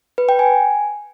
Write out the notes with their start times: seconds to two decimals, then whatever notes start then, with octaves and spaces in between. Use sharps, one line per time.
0.18 B4
0.29 G5
0.39 G#5